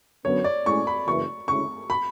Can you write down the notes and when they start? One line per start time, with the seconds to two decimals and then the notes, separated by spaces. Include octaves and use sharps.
0.25 F#2 D3 F#3 B3 C#5
0.44 D5
0.66 A2 G#3 C#4 C#6
0.87 B5
1.07 F#1 F#2 E3 C#6
1.48 D2 C#3 G#3 C#4 E4 C#6
1.90 B5